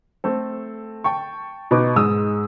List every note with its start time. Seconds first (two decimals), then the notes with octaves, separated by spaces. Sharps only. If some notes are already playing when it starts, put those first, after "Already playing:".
0.24 A3 C4 A4
1.04 G5 A5 C#6
1.71 B2 D#4 B4 D6
1.96 G#2 G#3 D#4 D#6 E6